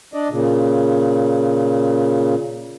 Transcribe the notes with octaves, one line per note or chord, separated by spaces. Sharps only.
D4 D5 D#5
A#2 C#3